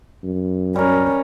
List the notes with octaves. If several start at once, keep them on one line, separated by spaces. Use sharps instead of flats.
F#2
G3 C#4 A#4